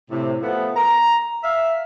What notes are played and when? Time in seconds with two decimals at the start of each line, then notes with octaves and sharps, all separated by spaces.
0.11 A2 C3
0.42 F3 A3 B3
0.76 A#5
1.44 E5 F5